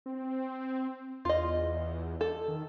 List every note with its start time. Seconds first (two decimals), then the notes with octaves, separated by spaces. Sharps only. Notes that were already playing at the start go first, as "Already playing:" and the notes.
0.06 C4
1.25 E2 F4 D#5
2.21 A4
2.48 D#3